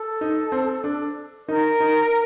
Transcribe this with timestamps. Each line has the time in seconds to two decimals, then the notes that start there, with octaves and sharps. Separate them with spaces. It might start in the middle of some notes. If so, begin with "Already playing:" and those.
Already playing: A4
0.21 D#4
0.52 C4
0.84 D4
1.48 D#4 A#4
1.80 D#4